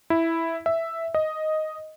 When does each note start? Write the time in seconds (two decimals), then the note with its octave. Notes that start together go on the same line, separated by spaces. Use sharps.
0.10 E4
0.66 E5
1.15 D#5